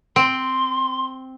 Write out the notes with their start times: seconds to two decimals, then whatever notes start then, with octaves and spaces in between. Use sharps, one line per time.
0.16 C4 C6